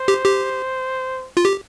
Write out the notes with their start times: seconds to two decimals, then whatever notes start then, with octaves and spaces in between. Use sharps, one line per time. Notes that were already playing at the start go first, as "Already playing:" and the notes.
Already playing: C5
0.08 G4
0.25 G4
1.37 F4
1.45 G4